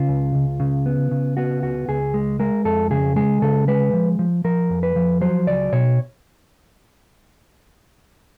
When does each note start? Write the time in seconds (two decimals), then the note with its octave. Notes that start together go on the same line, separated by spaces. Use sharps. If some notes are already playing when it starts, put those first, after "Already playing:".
Already playing: C#3 F4
0.09 C#2
0.35 C#2
0.60 C#3
0.86 B3
1.11 C#3
1.37 B3 F#4
1.63 C#2 F#4
1.88 C#2 G#4
2.14 G#3
2.40 G#3 A#4
2.65 F2 A4
2.91 C#3 G#4
3.16 G#3 G#4
3.42 C#3 A4
3.68 G#3 B4
3.93 F3
4.19 F3
4.44 F3 A#4
4.70 F2
4.83 B4
4.96 F3
5.21 F#3 C5
5.47 C#2 D5
5.72 B2 C#5